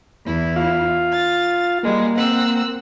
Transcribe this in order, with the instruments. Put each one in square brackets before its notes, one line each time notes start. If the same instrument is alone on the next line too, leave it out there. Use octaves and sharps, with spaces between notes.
[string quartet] E2 E4
[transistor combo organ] F4 F5
[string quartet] A6
[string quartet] G3 G#3 [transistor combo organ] A#3
[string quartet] C4 F#5 E6